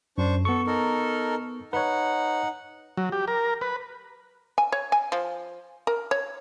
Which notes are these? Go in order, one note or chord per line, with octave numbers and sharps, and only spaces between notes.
F#2 D4 C5 C#6
B3 A4 C#6
D#4 A4 A#4
D#4 B4 C#5 F#5
F#3
G4
A#4
B4
G#5
C#5
G#5
F3
A#4
C#5